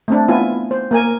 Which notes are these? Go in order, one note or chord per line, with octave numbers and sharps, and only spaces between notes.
A3 C4 D4
B3 E4 F4 G#5
C5
A#3 A#4 G#5